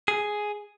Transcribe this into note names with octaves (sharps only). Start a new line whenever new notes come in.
G#4